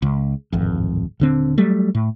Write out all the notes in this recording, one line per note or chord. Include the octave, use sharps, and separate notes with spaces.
C#2
D1 G#1 F2
D#1 D3 C4
F#3 G3 A3
A2